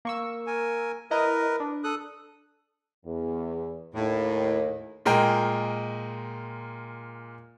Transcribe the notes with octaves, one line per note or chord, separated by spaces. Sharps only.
A#3 C#6 E6
A#4 G#5
E4 A#4 B4 D#5 A#5
D4
A4 D#6 F#6
E2
D#2 A2
A#2 G#3 A#4 G5